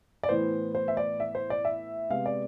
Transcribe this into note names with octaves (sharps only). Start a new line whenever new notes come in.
D5
A2 E3 B3 C5
C5
E5
D5
E5
C5
D5
E5
C3 G#3 B3 F5
D5